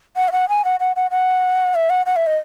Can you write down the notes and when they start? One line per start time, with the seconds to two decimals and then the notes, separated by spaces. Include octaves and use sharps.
0.16 F#5
0.28 E5
0.32 F#5
0.49 G#5
0.65 F#5
0.80 F#5
0.96 F#5
1.11 F#5
1.75 E5
1.90 F#5
2.06 F#5
2.16 E5
2.27 D#5